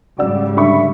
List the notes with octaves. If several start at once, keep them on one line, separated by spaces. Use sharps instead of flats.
G#2 C#3 G3 F#4 D5 E6
D3 E5 B5 C#6